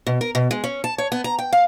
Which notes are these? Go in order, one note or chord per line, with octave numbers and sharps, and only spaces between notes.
B2
A#4
B2
G#3
C#4
A5
C#5
B3
A#5
G5
F5